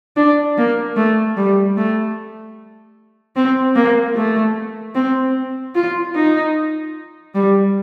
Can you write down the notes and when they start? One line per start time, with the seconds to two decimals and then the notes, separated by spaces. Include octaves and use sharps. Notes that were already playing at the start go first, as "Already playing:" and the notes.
0.16 D4
0.57 A#3
0.96 A3
1.36 G3
1.76 A3
3.36 C4
3.76 A#3
4.15 A3
4.95 C4
5.75 F4
6.15 D#4
7.34 G3